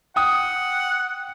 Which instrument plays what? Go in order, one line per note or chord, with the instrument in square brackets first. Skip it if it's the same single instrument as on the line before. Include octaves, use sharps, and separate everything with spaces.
[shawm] F#5 [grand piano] G5 D#6